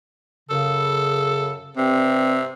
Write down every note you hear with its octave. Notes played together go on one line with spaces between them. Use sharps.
F#2 C#3 A4
G2 C3 C4